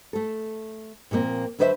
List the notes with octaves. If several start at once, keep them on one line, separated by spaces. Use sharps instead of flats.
A3 A4
A#2 F3 G3 A#3 C4
D3 F#3 B4 C5 D5 E5